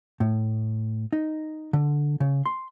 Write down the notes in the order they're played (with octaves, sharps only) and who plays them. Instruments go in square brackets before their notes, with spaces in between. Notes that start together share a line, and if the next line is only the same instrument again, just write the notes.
[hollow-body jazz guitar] A2
D#4
D3
C#3
C6